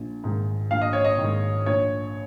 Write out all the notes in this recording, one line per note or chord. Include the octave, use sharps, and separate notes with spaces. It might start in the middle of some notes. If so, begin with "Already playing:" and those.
Already playing: A#1
G#2 D#3
A#1 F5
D#5
C#5
D#5
G#2 D#3
A#1 C#5